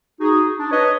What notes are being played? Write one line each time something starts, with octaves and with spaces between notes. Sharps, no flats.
D#4 F#4 G#4
D4
B4 C#5 D#5